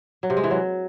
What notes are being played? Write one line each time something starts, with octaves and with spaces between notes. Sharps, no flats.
F#3
C3
G#3
E3
F#3